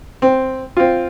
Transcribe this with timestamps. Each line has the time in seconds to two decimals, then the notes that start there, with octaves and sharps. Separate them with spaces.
0.22 C4
0.77 C4 F4